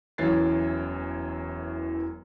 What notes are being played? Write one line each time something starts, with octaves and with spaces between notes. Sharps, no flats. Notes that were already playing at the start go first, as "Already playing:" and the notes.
E1 F#2 E3 C#5 A6 C7